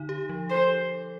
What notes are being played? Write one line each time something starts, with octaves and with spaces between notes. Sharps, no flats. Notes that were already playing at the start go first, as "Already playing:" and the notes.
Already playing: D3 D#4
G4
F3
A4 C5